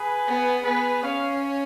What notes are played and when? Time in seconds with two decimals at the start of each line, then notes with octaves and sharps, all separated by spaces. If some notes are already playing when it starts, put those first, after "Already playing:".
Already playing: G#4 B4
0.28 B3
0.65 B3 G#4 B4
1.03 C#4 C#5 F5